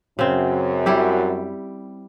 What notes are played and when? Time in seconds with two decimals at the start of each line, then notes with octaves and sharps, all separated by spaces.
0.19 F#2 C#3 C4
0.86 G3 E4 G4